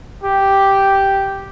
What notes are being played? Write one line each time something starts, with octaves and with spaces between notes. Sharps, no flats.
G4